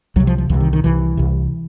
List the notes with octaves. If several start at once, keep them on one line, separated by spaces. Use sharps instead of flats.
C2 C3 F#3
F3
F3
C2 C3 E3
D#3
D#3
C2 C3 E3
C2 C3